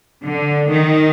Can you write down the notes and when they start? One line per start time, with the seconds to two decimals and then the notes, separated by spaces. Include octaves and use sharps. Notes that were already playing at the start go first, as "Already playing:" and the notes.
0.23 D3
0.69 D#3